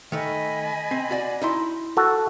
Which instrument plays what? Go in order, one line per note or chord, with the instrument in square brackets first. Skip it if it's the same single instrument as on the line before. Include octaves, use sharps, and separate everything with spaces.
[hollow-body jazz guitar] D#3 A3 [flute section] D#5 G#5 B5
[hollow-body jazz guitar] C4
F#4 D5
D#4 E4 C6
[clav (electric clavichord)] F#4 A4